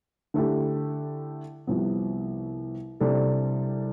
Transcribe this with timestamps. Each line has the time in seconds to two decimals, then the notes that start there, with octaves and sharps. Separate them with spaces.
0.34 D3 A3 E4 G4
1.67 C2 C3 F3 B3
3.00 C2 C3 G3 D4 A4